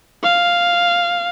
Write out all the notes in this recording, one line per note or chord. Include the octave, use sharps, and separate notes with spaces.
F5